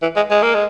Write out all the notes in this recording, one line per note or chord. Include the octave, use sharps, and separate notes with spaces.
E3
G#3
G#3
A#3
G#3